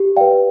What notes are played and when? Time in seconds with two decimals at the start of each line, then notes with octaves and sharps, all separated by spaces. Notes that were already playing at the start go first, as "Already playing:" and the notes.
Already playing: G4
0.16 D5 F5 G5
0.21 B4